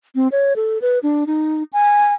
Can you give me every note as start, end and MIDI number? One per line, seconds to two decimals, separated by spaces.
0.15 0.28 60
0.32 0.53 73
0.56 0.78 69
0.82 0.99 71
1.03 1.24 62
1.27 1.63 63
1.73 2.14 80